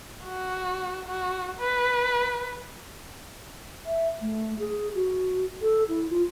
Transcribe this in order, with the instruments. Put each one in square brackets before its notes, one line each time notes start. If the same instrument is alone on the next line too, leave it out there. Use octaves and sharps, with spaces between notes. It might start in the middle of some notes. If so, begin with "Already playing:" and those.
[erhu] F#4
F#4
B4
[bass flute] E5
A3
G#4
F#4
A4
E4
F4